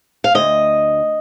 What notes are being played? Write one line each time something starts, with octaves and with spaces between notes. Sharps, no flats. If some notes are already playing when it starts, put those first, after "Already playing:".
F5
D2 D#5